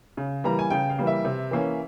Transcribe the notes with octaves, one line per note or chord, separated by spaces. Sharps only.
C#3
E3 G3 A#3 A#5
G#5
C#3 G5
F5
E3 G3 A#3
E5
C3
E3 A#3 C#4